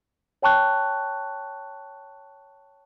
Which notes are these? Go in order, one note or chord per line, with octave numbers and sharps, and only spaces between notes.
C#5 G5 A5 C#6 F#6